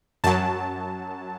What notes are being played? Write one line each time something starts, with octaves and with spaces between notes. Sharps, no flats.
F#2 F#3 A5